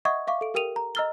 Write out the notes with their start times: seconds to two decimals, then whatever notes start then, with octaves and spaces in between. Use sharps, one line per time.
0.05 D#5 E5 F#5 C#6 D#6 G#6
0.27 E5 F5 C#6 D6
0.41 A4 D7
0.54 G4 A#4 G5 D#6 D#7 F7
0.76 A#5
0.95 D#5 A#5 E6 F6 A6 G7